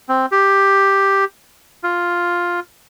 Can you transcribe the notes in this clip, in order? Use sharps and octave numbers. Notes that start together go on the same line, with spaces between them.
C4
G4
F4